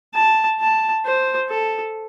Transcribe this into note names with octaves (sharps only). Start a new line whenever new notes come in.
A5
A5
C5
A4